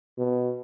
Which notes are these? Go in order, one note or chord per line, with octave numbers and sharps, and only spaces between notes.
B2